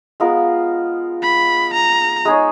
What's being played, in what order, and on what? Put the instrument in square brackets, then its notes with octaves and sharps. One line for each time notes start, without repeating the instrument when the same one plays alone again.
[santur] G#3 B3 F4 A#4
[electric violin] B5
A#5
[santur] G#3 D#4 G#4 C#5